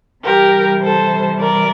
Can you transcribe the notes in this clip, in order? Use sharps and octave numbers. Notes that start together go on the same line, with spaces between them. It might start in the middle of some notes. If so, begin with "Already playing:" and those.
C3 E3 G3 G4 A#4
A4 C5
A#4 D5